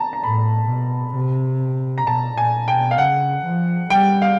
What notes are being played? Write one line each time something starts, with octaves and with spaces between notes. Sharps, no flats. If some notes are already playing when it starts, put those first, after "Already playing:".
Already playing: A5 A#5
A#5
A2 B5
B2
C3
A#5
B2 A5
A#2 G#5
B2 G5
F5
C#3 F#5
F3
G3 G5
F5